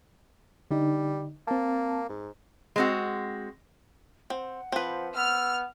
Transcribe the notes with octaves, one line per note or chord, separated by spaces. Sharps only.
D3 G3 D#4
A#3 C4 A5
G#2
G#3 C4 F#4
C4 F#5
F3 C4 B4
B3 E6 F6